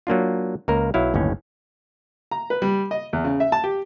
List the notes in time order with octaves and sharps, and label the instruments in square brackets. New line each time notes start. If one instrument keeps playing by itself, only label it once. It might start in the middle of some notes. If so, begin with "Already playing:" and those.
[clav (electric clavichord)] F#3 A#3 D4 F4
C#2 A#3 A#4
B1 F#3 E4 F5
G1 D#2 A2 C#4
[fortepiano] A#5
B4
G3
D#5
E2
C#3
E5
A5
G4